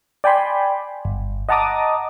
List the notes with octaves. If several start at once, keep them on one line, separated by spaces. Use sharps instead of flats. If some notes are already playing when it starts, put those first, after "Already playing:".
D5 G5 G#5 B5 C6
G1
D#5 F#5 A5 A#5 D6 D#6